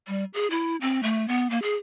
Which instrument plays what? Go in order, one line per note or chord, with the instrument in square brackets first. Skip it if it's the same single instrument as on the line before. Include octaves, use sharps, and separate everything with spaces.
[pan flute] G3
G#4
E4
C4
A3
B3
A#3
G#4